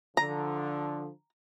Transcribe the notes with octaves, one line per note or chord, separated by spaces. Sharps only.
D3 F3 A#5